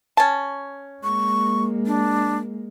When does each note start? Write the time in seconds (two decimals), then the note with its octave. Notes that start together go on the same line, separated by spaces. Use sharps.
0.17 C#4 A5
1.04 G#3 A#3 C#6
1.86 D4